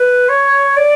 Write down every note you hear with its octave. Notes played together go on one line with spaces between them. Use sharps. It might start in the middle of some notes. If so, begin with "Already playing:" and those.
Already playing: B4
C#5
D5